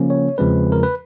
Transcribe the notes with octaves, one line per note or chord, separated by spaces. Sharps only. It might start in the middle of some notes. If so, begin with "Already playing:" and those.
Already playing: C#3 F3 A#3 C#4
C#5
E2 C#3 F3 G#3 C4 B4
A#4
B4